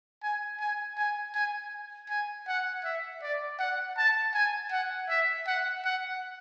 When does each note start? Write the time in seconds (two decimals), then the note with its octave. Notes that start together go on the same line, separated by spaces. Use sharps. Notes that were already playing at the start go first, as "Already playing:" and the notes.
0.23 G#5
0.60 G#5
0.98 G#5
1.35 G#5
2.09 G#5
2.47 F#5
2.84 E5
3.22 D5
3.59 F#5
3.98 A5
4.34 G#5
4.71 F#5
5.09 E5
5.47 F#5
5.85 F#5